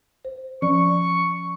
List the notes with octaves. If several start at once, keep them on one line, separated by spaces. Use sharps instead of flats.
C5
F3 C#4 D5 C#6